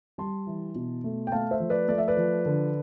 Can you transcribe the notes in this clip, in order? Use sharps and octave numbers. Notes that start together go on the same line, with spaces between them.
G3 A5 C6
E3
B2
A3
G5
A3 F5 A5
C5 E5
F3
B4 D5
A3 D5
E5
B4 D5
F3
D3